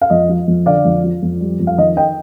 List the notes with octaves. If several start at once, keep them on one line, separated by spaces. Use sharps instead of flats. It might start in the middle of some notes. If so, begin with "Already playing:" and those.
F5
F2 D#5
F3
F2
D3 D5 F5
F2
F3
F2
G3
F2
F5
D#3 D#5
D#5 G5